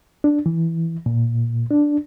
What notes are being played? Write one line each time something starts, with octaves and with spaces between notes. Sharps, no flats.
D4
E3
A#2
D4